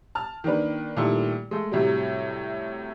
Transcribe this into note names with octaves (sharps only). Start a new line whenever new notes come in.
A5 F6
D#3 A#3 D4 B4
A#2 D#3 G3 A3 E4
G#3 A3
A2 C3 F#3 G3